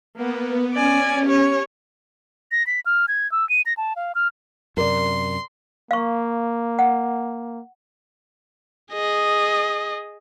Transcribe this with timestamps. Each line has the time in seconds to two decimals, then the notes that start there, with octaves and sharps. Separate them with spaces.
0.17 A#3 B3
0.74 C#4 D5 G#5
1.26 G4 C#5
2.51 A#6
2.67 B6
2.86 F6
3.08 G#6
3.32 E6
3.49 D#7
3.66 A#6
3.77 A5
3.96 F5
4.15 F6
4.77 F#2 C3 A#4 D5 C6
5.91 A#3 F5 C#6
6.79 F#5
8.92 G#4 D#5